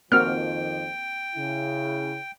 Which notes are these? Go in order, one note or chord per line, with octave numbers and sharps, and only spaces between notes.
F2 D#3 F3 A#3 C4 F#4 G5 F6
C#3 E4